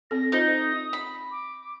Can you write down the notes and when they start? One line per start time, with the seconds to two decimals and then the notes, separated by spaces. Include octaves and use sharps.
0.11 C4 A4 A#6
0.32 D#4 F4 C5 D#5 D#6
0.93 B5
1.31 D6